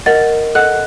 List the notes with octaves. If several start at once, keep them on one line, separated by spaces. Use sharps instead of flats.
A#4 D#5 F#5 A6
A4 D#5 F#5 F#6